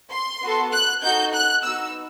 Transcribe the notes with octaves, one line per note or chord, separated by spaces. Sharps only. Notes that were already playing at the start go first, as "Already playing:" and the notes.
C6
B3 F#4 A4
F#6
D#4 F#4 A4 G6
F#6
B3 D#4 F#4 E6